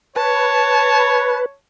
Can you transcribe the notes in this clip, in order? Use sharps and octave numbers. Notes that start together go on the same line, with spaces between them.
B4 C#5 A5